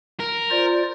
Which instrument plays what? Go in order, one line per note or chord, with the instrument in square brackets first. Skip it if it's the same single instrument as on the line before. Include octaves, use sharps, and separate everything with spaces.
[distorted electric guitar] A#4
[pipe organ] F4 C5 D5